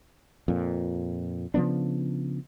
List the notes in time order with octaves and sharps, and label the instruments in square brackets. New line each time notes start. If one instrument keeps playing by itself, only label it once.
[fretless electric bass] F2 A#2
C#3 F3 B3 D4